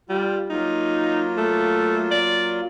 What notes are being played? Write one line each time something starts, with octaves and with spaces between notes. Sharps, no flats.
G3 F4
F#3 A#3 D#4 F4
A3
D5